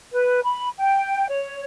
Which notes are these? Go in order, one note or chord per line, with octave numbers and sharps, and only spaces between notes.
B4
B5
G5
C#5